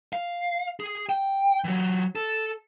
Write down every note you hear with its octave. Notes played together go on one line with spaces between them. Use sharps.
F5
G#4
G5
E3 F#3
A4